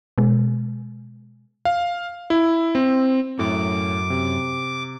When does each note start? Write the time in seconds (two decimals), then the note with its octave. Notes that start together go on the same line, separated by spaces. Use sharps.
0.18 B2 G#3
1.65 F5
2.30 E4
2.75 C4
3.39 F#2 A2 D6
4.10 C3